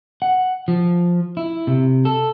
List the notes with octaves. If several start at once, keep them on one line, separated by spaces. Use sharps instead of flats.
F#5
F3
E4
C3
A4